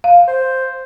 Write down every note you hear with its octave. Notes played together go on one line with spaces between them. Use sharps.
F5
C5